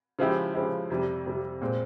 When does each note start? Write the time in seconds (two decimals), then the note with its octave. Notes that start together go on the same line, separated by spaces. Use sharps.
0.19 C#3 F3 G#3 E4 G4
0.55 C#3 F3 G#3 E4 G4
0.90 F2 C3 G3
1.26 F2 C3 G3
1.61 A#2 G#3 C4